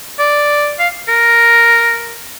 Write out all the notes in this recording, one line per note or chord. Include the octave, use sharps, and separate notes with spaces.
D5
F5
A#4